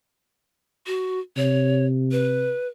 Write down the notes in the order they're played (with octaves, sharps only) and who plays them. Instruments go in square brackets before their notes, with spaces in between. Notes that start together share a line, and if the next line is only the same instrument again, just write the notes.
[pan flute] F#4
[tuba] C3 [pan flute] C#5
[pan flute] B4